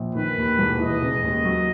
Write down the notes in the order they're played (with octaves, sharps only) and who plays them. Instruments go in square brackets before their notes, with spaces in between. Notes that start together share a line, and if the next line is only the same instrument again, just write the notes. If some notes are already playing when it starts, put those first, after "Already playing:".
Already playing: [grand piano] A#1
[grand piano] D#3 [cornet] B4
[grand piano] D#2
E1
[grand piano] E3 [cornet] D#5
[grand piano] C#3
D#2
F#3